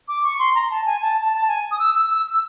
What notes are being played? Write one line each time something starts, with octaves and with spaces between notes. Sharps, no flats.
D6
C#6
C6
A#5
A5
G#5
A5
A5
A5
G#5
D#6
E6
E6
E6
E6